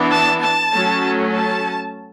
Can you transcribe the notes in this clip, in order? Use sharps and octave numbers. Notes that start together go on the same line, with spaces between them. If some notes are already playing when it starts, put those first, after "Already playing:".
Already playing: E3 B3 D4
A5
A5
F#3 A3 C#4
A5